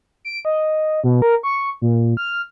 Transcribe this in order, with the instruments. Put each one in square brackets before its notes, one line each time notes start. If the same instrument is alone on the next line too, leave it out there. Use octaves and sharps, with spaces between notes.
[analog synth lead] D7
D#5
B2
A#4
C#6
A#2
F6